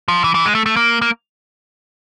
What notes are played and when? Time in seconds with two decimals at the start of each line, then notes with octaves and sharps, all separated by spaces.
0.08 F3
0.24 E3
0.35 E3
0.45 G#3
0.55 A3
0.66 A3
0.76 A#3
1.02 A#3